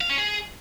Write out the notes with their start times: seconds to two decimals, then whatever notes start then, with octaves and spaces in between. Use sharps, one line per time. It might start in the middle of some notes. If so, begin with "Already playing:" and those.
0.01 F5
0.10 C#4
0.18 G#4